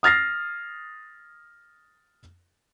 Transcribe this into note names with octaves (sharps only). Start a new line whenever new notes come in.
D#6 F6 A6 A#6 C7